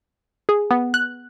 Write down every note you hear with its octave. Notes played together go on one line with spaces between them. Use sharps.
G#4
B3
F#6